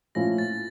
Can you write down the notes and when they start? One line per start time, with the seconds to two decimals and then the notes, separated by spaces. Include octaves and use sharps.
0.15 A#2 F3 A3 C#4 E4 A#6
0.38 A6